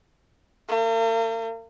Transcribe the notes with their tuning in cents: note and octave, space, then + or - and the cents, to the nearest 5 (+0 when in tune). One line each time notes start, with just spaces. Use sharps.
A#3 -45